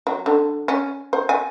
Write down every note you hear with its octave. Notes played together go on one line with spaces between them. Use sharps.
F#3
D3
C#4
C5
G#5